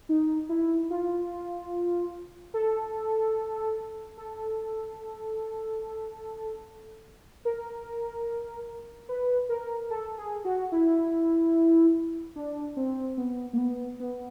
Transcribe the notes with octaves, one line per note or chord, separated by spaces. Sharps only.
D#4
E4
F4
A4
A4
A#4
B4
A#4
A4
G#4
F#4
E4
D4
C4
B3
A#3
B3
B3